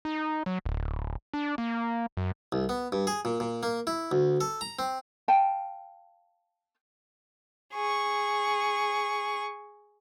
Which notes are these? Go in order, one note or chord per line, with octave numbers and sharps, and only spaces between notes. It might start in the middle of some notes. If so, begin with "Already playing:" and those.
D#4
F#3
D1
D4
A#3
F#2
C2
B3
G2
G#4
A#2
A#2
A#3
E4
D2
A4
A#5
C4
F5 G5 A5
G#4 C#6